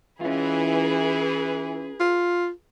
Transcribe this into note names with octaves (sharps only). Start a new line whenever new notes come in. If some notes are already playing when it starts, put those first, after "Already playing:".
E3 C#4 F4 G#4 B4
F4